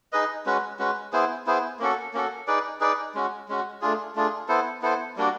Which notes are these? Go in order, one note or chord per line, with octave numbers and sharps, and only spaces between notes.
D#4 G#4 B4 D#5
G#3 C#4 F#4 B4
G#3 C#4 F#4 B4
B3 E4 G#4 C5
B3 E4 G#4 C5
A#3 C#4 F#4 A4
A#3 C#4 F#4 A4
D#4 G#4 B4 D5
D#4 G#4 B4 D5
G#3 C#4 F#4
G#3 C#4 F#4
A3 D4 F4 G#4
A3 D4 F4 G#4
B3 E4 A4 C5
B3 E4 A4 C5
G3 A#3 D4 F#4